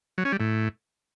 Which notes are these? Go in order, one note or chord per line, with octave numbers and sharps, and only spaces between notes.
F#3
C#4
G3
A2